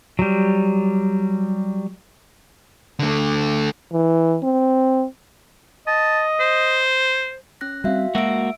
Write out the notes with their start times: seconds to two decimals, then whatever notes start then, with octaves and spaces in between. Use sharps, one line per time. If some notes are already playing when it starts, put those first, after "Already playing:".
0.19 F#3 G3
2.99 D3 A3
3.93 E3
4.44 C4
5.87 D#5 A5
6.40 C5
7.61 C#4 F#6 A#6
7.84 G3 C4 F#4 E5 F5
8.15 G#3 A#3 F#4 E5 E6 D7